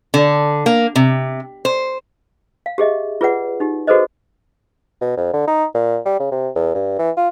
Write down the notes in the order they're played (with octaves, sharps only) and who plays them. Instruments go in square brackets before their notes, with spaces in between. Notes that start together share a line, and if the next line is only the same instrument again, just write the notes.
[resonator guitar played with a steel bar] D3
A#3
C3
C5
[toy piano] F5
G4 G#4 D#5 E5
F4 G#4 B4 D5 F#5
D#4 G4
F#4 G#4 A4 B4 C5 D#5
[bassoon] B2
F2
D3
D#4
A#2
G3
C#3
C3
E2
G2
E3
F4